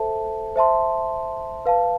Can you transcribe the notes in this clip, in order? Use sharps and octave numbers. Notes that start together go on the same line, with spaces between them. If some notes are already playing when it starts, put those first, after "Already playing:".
Already playing: A4 C5 E5 A5
C5 E5 A5 C6
B4 F5 A5